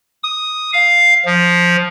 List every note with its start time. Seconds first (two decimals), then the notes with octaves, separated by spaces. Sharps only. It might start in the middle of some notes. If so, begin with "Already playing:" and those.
0.23 D#6
0.73 F5
1.25 F3